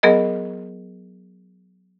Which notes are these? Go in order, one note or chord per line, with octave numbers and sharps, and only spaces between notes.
F#3 B3 G#4 A#4 D#5